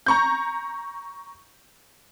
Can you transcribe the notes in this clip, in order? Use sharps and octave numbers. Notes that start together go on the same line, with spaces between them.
A#5 C#6 G6